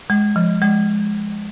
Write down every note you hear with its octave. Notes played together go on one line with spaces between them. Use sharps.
G#3
F3
G#3